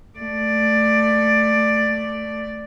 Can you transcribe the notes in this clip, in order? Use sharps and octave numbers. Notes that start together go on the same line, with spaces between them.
A3 D5